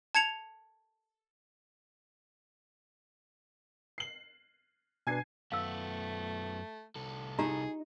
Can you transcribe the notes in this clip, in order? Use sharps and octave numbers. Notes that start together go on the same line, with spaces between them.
A5 G#6 C#7 F7
C7 F#7
B2 D4 B4 G#5 G#6 C7
F#2 A3 B3 F5 E6
C2 A4
D#4 F4 G4 G#4 A#5